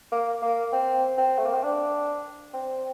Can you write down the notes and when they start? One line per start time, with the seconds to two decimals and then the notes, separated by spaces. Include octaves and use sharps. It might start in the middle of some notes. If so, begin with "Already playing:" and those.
0.12 A#3
0.42 A#3
0.72 C4
1.17 C4
1.39 A3
1.46 A#3
1.54 C4
1.63 D4
2.54 C4